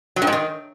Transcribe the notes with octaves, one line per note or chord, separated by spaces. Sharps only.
F#3
G2
G#2
D#3